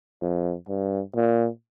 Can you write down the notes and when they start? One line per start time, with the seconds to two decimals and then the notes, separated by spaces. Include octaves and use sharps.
0.22 F2
0.69 G2
1.16 A#2